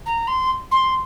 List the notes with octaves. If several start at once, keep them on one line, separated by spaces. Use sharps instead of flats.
A#5
C6
C6